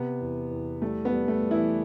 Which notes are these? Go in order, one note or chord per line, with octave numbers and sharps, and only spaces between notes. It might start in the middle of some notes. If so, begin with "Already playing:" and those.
Already playing: C3 B3
E2
E2
G3 A3
B3
G3
A3
G3
E3 E4